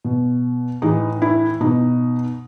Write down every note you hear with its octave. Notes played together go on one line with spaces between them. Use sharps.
B2
A2 E3 D#4
E4
B2 D#4